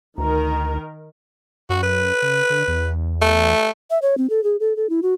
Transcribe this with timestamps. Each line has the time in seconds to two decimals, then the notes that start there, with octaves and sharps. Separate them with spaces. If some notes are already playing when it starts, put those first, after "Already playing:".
0.18 D2 D#3 A#4 A#5
1.69 F#2 F#4
1.83 B4
2.22 C#3
2.50 D3
2.68 E2
3.22 A3
3.90 E5
4.02 C#5
4.18 C4
4.30 A4
4.44 G#4
4.60 A4
4.76 A4
4.90 E4
5.03 F#4